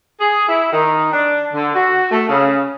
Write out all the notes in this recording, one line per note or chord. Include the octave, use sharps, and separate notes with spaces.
G#4
E4
D#3
D4
D3
F#4
A3
C#3